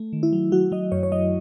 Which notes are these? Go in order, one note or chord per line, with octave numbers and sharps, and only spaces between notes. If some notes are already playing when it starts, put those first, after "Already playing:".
Already playing: A3
D#3
E4
F#3
F#3 F#4
F#3 D#5
F#2 C#5
C#5
F#3 D#5